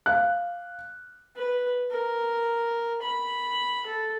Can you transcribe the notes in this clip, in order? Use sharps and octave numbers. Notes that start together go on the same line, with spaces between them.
F5 F#6
B4
A#4
B5
A4